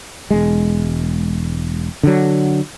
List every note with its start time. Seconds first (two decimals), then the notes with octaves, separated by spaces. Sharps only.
0.31 E1 G#3
2.03 D3 F#3